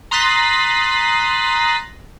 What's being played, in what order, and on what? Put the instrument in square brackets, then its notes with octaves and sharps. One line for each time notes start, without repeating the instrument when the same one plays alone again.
[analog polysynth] A#5 C6 D#6 F#6 A6 B6